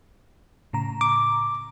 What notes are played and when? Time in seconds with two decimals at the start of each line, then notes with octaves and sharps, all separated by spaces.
0.73 A2 C#3 A#5
1.01 D6